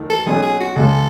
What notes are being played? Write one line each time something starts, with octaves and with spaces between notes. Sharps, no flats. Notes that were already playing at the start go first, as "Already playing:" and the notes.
Already playing: D#2 D#3 A3
A4
B1 B2 F#3 C#4 G#4
G#4
F#4
C#2 C#3 G#3 A4